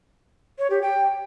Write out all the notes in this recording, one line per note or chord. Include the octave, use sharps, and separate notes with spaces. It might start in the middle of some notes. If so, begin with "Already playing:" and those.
C#5
G4
G5